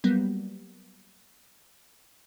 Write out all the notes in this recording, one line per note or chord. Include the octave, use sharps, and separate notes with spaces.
F#3 G3 A#3 B3